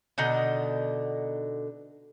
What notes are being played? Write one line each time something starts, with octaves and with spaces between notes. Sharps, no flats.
B2 D3 D#4 D#5